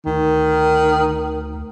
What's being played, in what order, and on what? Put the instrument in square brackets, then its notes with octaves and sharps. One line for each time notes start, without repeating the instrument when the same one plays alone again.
[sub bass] D2 [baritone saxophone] D#3